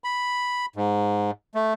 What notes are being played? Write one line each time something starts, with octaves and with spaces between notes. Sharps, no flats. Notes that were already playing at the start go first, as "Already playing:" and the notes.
B5
G#2
A3